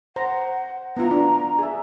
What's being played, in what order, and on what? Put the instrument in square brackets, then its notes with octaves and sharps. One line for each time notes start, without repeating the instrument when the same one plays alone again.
[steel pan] C5 A#5 [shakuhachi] F#5
[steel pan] B3 E4 F4 [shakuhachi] A#5
[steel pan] D4
G#4 E5